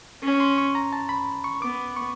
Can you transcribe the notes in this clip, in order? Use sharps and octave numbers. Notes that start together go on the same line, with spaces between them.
C#4
C6
C#6
A#5
A5
B5
C#6
B3 D6
C#6